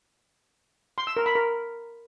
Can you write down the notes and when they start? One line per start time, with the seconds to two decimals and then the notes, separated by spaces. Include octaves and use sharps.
0.98 C6
1.07 E6
1.17 A#4
1.26 B5
1.35 A#4